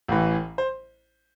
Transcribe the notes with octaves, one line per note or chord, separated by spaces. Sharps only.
A1 A2 E3
C5